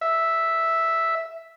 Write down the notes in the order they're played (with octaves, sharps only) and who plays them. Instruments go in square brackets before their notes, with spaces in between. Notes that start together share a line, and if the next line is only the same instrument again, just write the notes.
[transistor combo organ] E5